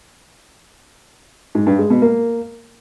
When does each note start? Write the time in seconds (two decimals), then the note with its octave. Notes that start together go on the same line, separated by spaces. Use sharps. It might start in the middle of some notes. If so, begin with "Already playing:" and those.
1.55 G#2
1.67 G2
1.78 G#3
1.90 B2
2.02 A#3